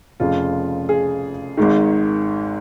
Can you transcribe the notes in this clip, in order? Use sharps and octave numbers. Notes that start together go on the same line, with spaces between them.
F1 F2 C#3 F4
G#4
G#1 G#2 D#3